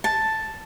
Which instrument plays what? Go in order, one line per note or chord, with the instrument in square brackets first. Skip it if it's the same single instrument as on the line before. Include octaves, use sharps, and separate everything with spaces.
[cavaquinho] A5